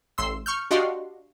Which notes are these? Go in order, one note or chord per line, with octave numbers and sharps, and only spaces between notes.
A1 C6 E6
C#6 F6 G6
D4 F#4 G4 D#5 F5 C6